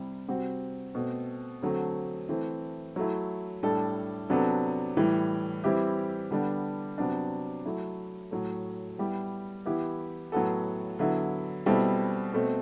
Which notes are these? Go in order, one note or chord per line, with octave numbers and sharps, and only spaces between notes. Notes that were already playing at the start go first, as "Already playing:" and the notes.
Already playing: C3 G3 C4 E4
C3 G3 C4 F#4
B2 A3 C4
D3 F#3 A3 C4
E3 A3 C4
F#3 A3 E4
A2 G3 D4 A4
C3 F#3 B3 D4 A4
A2 E3 G3
E3 G3 C4 E4 G4
D3 G3 B3 D4
C3 F#3 B3 D4
F#3 A3 E4
A2 F#3 A3
G3 B3 E4 G4
E3 B3 E4 G4
A2 F#3 B3 F#4 A4
D3 F#3 B3 E4
B2 G3 C4 E4 A4
B2 A3 C4